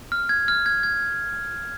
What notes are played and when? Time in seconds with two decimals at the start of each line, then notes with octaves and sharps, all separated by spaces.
0.12 F6
0.29 G#6
0.48 F6
0.66 G#6
0.83 G#6